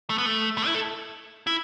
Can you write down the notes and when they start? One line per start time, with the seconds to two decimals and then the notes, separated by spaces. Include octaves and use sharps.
0.10 A3
0.18 B3
0.26 A3
0.58 A3
0.67 E4
0.75 A4
1.47 E4